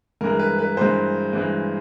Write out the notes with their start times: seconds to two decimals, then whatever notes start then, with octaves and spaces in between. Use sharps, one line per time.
0.21 G2 E3 G#3 A#4
0.39 B4
0.59 B4
0.77 G2 E3 G#3 C5
1.33 G2 E3 G#3